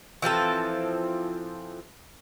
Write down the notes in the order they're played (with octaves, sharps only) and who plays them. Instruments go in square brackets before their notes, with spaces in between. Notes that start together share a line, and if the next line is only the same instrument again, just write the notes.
[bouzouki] E3 F3 C4 A4